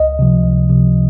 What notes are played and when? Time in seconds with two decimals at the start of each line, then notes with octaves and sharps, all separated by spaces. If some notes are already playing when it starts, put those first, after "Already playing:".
Already playing: C#2 D#5
0.19 C3 F3
0.44 C#2
0.70 C3 F3